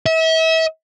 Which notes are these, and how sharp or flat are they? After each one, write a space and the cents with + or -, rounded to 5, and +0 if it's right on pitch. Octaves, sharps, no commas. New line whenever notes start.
E5 -35